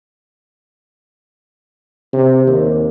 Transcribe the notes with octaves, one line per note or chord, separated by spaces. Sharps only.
C3
D#2